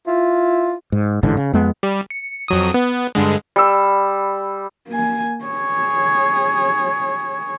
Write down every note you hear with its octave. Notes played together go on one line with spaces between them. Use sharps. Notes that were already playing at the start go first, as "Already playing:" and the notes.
E4 F4
G#2
A1 G#2 D3 E3
C#3
F2 G#3 B3
G3
C#7
F2 F#3 D#6
B3
G2 D3 G#3
G3 E6
A#3 G#5
G#4 C#5